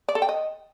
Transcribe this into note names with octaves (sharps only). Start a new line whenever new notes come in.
D5
A4
G5
D#5